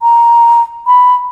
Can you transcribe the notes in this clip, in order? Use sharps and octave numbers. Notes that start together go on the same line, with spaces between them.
A#5
B5